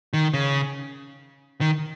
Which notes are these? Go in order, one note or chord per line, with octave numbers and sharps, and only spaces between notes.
D#3
C#3
D#3